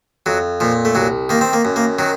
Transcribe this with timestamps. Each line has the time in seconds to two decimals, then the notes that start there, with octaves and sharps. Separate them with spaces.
0.26 F2 F#3
0.60 A#2 F3
0.85 A3
0.95 C2 F#3
1.29 D#3 A#3
1.41 C4
1.53 A#3
1.65 F#2
1.76 A#3
1.99 D#3 F#3